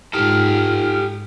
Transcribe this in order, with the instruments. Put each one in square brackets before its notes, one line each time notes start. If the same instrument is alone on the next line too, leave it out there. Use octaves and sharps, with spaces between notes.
[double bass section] G#2 [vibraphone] D#4 F4 [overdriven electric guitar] G4 A4 [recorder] F6